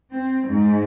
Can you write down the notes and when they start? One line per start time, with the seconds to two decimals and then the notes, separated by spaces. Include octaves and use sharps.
0.13 C4
0.48 G#2